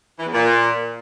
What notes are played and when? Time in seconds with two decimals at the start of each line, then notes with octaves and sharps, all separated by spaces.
0.19 E3
0.26 E2
0.33 A#2